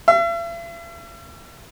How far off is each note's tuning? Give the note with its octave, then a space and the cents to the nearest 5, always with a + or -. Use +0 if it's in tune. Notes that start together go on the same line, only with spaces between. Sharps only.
E5 +45